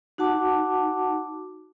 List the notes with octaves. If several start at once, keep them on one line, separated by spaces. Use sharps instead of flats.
D#4 F#4 F#5 A5 D6